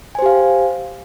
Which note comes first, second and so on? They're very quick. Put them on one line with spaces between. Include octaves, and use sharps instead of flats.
G#5 C5 G4 F5